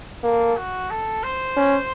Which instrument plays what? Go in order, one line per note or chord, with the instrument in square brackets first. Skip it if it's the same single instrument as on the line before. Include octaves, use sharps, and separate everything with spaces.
[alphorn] A#3 [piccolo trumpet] A4
[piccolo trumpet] F#4
A4
C5
[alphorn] C#4